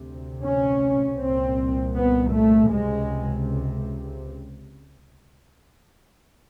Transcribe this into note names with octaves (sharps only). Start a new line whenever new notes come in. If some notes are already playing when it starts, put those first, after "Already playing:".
Already playing: D2 C3
C#4
C2 A#2 C4
B3
A3
C#2 C3 G#3